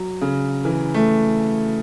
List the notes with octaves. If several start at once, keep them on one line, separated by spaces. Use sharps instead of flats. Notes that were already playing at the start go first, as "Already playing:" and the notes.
Already playing: F#3
C#3
E3
A3